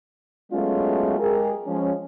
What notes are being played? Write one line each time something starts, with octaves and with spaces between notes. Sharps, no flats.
F#3 G#3 A3 B3 C#4 F4
G#3 G4 G#4 A#4
F3 G#3 C#4